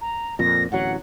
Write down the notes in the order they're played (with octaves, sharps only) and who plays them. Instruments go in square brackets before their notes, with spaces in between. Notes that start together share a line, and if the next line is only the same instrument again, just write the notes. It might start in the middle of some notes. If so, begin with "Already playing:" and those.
[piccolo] A#5
[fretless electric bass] F2 A#2 [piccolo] A#6
[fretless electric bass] D1 A1 F#3 [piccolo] F#5